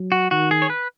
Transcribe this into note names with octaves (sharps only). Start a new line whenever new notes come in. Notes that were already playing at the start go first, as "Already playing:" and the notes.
Already playing: F#3
F#4
D#3 F#4
G#4
C#5
B4